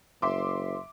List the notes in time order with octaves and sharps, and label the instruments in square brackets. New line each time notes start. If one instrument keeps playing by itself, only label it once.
[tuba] F#1 [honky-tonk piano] E5 C6 D6